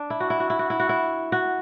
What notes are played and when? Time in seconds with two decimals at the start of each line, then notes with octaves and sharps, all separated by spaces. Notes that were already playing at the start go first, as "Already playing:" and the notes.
Already playing: D4
0.10 E4
0.20 F#4
0.30 E4
0.40 F#4
0.50 E4
0.59 F#4
0.70 E4
0.80 F#4
0.89 E4
1.32 F#4